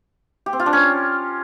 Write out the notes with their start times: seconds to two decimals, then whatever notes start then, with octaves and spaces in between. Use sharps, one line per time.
0.46 G4
0.53 C4
0.60 F4
0.66 D4
0.73 C#4